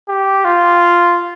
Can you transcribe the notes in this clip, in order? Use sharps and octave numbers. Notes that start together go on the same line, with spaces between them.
G4
F4